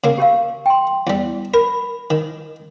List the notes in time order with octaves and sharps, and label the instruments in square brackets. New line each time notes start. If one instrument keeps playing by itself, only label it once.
[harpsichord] C#3 A#3
[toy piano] G4 A#4 F5
G5 C6
[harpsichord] E2 G3
[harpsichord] A#4 [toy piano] B5
[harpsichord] D#3